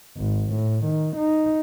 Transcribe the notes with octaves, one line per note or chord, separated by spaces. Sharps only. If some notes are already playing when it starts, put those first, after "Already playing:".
G#1
A2
D#3
D#4